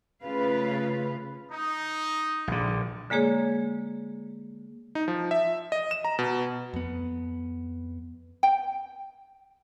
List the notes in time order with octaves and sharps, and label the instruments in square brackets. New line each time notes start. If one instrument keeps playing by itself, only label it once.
[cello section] C#3 A3 F4 B4 F5
[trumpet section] D#4
[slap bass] A#1 D3
[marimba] D3 G#3 A#3 G#4 C#5
[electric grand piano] D#4
F3
E5
D#5
E7
A#5
B2
[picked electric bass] F2 B3
[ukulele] G5